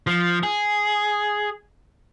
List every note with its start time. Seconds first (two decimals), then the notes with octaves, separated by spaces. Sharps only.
0.07 F3
0.43 G#4